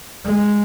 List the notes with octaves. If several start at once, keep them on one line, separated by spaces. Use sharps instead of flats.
G#3